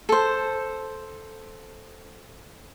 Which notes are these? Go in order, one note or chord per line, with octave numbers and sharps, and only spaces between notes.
A4 C5